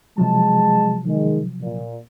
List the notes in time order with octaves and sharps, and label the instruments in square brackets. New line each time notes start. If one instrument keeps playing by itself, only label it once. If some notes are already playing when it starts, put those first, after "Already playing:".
[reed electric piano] C3 F3 F#3 [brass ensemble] G#3 A5
[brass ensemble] D#3 G#3
A#2